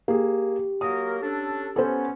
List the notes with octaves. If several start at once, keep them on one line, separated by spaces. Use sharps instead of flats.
A#3 G4 G#4
F#3 A#3 A#4 D#6
C#4 D4 A4
B3 C#4 A4 C5